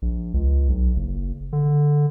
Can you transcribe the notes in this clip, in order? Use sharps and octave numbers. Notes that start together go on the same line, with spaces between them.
A#1
C#2
B1
F#1
D3